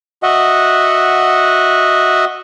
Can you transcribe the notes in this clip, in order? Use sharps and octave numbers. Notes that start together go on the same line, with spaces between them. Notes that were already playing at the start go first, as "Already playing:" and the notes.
F#4 D#5 E5 F#5